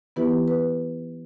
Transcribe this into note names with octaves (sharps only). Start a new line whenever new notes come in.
E3 B3 E4 G4 B4
B4